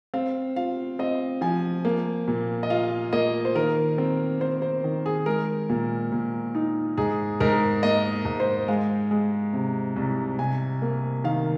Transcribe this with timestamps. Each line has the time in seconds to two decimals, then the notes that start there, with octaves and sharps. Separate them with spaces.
0.14 C4 F5
0.56 F4 F5
0.99 C4 D#5
1.41 F3 G#5
1.85 A#3
2.28 A#2
2.63 D#5
2.70 F4 F5
3.12 A#3 D#5
3.45 C5
3.55 D#3 A#4
3.98 C4
4.41 C4 C5
4.62 C5
4.84 D#3
5.06 G#4
5.26 G#3 A#4
5.69 A#2
6.12 A#2
6.55 D#4
6.98 G#2 G#4
7.40 G#2 A#4
7.83 A#3 D#5
8.25 G#2
8.40 C5
8.68 G#3 F5
9.11 G#3
9.53 C3
9.96 C2
10.39 C3 G#5
10.82 A#3
11.24 D#3 F5